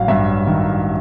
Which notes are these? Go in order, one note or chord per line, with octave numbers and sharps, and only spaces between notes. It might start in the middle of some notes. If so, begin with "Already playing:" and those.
Already playing: A1 F#3 F5
G2 E5
D#3